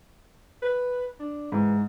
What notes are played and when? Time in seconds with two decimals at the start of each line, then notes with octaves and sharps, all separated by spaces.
0.62 B4
1.19 D4
1.52 G#2 E3